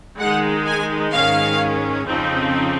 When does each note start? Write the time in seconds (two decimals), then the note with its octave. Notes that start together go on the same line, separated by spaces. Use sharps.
0.20 D#3 G#3 D#4 F#5
0.67 G#5
1.13 G#2 D#3 G#3 C#4 F5
2.06 F2 C#3 F3 C4 D#4